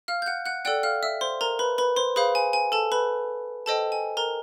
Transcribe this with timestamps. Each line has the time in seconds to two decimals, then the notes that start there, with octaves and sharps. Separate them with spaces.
0.08 F5 F6
0.22 G6
0.26 F#5 F#6
0.46 F#5 F#6
0.65 A4 D5 F#5 G5 F#6
0.83 F5 F6
1.03 E5 E6
1.21 C5 C6
1.41 A#4 A#5
1.59 B4 B5
1.78 B4 B5
1.96 C5 C6
2.16 G#4 B4 C5 F5 B5
2.35 G#5
2.53 G#5
2.72 A4 A5
2.92 B4 B5
3.66 A4 C5 D#5 G5 A5
3.92 G#5
4.17 A#4 A#5